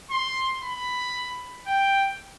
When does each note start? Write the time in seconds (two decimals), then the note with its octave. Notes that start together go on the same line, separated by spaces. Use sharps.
0.11 C6
0.63 B5
1.67 G5